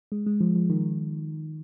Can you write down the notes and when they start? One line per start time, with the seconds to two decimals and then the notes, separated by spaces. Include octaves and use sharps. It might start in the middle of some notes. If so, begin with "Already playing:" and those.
0.12 G#3
0.26 G#3
0.41 F3
0.55 F3
0.70 D#3